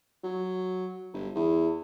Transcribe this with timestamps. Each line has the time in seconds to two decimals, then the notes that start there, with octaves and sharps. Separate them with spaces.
0.24 F#3
1.13 G1
1.35 E2